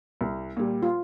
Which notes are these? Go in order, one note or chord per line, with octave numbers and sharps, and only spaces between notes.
C2
A#2 G3
F4